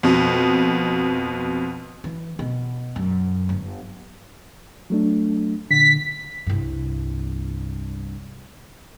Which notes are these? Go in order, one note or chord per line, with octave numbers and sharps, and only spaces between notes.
F2 B2
E3
B2
F#2
G1
F#3 A3 D4
A#2 D3 B6
C2 G2